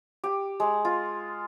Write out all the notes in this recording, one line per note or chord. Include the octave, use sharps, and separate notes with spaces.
G4
G#3
F4